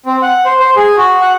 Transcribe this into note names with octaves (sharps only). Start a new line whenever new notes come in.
C4
F#5
C5
C5
G#4
F#4
F#5